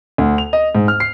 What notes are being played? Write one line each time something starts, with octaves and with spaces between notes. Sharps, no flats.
D2
F7
D#5
G#2
F6
C7